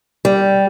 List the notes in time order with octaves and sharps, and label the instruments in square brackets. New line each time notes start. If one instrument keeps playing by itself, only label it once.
[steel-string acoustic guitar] G3